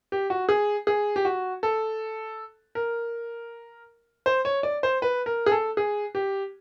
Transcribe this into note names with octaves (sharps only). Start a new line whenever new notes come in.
G4
F#4
G#4
G#4
G4
F#4
A4
A#4
C5
C#5
D5
C5
B4
A#4
G#4
A4
G#4
G4